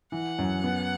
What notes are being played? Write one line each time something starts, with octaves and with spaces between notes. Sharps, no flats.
E3 F#5
F#2
B3